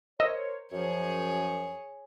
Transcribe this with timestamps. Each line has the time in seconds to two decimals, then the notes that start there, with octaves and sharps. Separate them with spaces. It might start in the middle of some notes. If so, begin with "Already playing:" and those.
0.20 A#4 C5 C#5 D#5 E6
0.72 F#2 F3 G#4 C#5